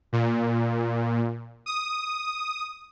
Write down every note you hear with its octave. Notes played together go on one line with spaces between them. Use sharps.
A#2
D#6